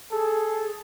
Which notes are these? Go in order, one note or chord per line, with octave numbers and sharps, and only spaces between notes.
G#4 A4